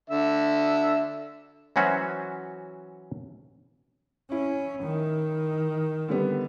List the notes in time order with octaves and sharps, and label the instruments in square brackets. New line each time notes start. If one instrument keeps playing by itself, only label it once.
[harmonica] D3 E5
[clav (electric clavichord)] E3 F#3 C#4 F#4 C5 E5
[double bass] C#4 [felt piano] E4
[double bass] D#3
[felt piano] D3 G3 B3